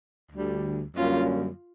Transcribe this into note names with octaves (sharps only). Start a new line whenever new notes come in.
D2 D3 G3
F#2 D3 G3 A#3 C#4 F4